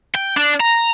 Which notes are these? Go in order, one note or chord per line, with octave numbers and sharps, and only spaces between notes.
G5
D4
A#5